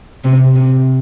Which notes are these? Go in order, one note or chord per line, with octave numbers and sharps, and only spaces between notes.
C3
C3